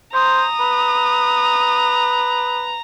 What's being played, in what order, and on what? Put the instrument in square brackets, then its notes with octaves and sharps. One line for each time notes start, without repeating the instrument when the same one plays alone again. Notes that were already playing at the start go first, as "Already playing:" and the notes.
[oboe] C5 [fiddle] A#5 [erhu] D#6
[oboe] B4